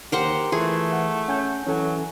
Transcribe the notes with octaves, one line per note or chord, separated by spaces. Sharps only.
D#2 G4 A#4 C5 F#5
E3 A3 F4 G#4 C6
F#5
C#4 F#5 G#5 G6
E3 F#3 C#4 A4 G#5